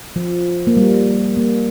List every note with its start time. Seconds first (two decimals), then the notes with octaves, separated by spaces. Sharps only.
0.16 F3
0.67 A#3
0.77 G3
1.37 A#3